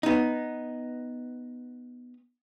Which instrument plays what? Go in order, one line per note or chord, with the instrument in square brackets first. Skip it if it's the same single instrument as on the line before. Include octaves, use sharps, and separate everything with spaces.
[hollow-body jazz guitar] B3 D#4